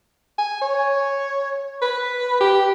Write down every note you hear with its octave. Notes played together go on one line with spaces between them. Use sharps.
G#5
C#5
B4
G4